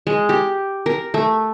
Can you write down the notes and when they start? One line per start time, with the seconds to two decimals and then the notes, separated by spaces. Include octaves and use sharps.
0.07 G#3
0.29 G4
0.86 A#4
1.14 A3